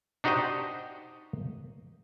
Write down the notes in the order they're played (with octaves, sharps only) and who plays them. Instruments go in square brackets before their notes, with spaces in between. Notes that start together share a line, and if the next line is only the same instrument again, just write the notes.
[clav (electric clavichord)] D4 D#4 F#4 G4 C5 D#5